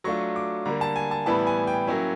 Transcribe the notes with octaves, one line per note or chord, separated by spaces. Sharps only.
F#3 A3 D4 F4 C#6
D6
D3 G3 A#3 A#5
A5
G#5
A5
A2 E3 G3 B3 E4 A5
G#5
G5
F#3 A#3 C#4 E4